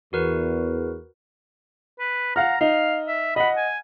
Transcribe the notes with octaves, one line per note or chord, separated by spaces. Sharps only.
E2 F#4 A#4 B4
B4
F5 F#5 A#5 F6
D#4 F5
E5
D#5 F#5 B5
G#5